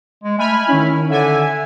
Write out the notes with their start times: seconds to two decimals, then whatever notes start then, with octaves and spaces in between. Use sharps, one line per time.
0.24 G#3
0.38 A3 G#5 B5 F6
0.68 D#3 C#4 E4
1.09 D3 E5 G#5